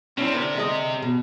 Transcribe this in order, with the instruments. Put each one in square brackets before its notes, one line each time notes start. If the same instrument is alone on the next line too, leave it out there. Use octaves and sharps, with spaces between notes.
[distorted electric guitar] C3 [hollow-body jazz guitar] C#4 D4 E4
[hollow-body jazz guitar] D3 A#4
D3 G#3 D#5
B2